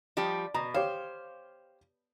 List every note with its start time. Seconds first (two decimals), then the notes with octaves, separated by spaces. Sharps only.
0.17 F3 G3 G4
0.54 B2 A#5
0.74 G4 C5 C#5 F5